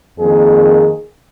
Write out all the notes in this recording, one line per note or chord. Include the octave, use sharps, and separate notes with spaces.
F2 D#3 A#3 G#4